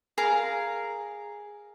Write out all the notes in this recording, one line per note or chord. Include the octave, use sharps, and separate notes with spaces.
G#4 A#4 F5 A#5